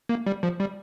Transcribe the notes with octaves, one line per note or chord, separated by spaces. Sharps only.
A#3
G3
F3
G3